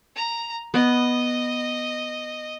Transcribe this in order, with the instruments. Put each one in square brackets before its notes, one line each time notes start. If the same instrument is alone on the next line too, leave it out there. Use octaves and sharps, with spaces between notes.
[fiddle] A#5
[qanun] B3 [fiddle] D#5